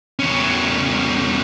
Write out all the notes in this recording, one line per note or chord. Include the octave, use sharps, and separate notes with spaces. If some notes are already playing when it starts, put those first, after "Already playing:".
E2 C#4